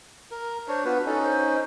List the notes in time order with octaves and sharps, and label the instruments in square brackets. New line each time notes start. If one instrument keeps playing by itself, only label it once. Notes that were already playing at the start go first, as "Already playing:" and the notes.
[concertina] A#4
[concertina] D4 C#5 [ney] C5
[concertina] B3 F#4 B4 [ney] F4
[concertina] C#4 D#4 [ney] A4
[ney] C5